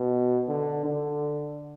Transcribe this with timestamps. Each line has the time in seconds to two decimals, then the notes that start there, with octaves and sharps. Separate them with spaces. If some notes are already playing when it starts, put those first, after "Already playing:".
Already playing: B2
0.48 D3
0.85 D3